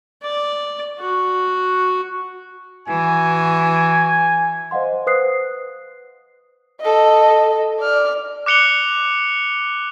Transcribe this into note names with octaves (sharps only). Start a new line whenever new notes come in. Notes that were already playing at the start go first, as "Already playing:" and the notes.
D5
F#4
E3 F#4 G#5
C5 D#5 F5 F#5 C6
B4 C5 D#6 F#6 C7
A4 D#5
D5 F6
D6 F#6 C#7 F7 G7